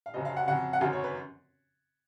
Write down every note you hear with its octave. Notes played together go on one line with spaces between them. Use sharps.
F5
F#1 F#2 C#3 F#3 D#5
F5
F#5
F2 C#3 F#3 F#5
F#5
G#1 F#2 C#3 F#3 F5
C#5
B4